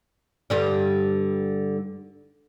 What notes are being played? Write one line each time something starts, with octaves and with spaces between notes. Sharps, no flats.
G2 D3 G3